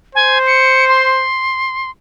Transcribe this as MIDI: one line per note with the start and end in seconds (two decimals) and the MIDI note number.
0.15 1.25 72
0.15 0.38 80
0.47 0.87 97
0.88 1.90 84